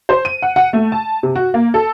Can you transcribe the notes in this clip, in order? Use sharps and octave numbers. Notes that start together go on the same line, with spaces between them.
C5
D#7
F#5
F#5
A3
A5
C3
F#4
A#3
A4